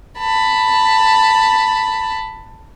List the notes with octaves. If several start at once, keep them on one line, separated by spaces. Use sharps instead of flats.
A5 B5